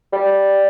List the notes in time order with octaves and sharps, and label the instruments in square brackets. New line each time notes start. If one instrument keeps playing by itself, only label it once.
[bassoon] G3